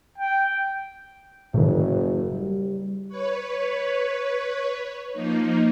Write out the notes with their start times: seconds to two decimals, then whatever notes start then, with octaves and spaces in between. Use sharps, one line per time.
0.18 G5
1.54 F#1 A2 D#3
2.33 G3
3.08 B4 C#5
5.13 F3 A#3 D#4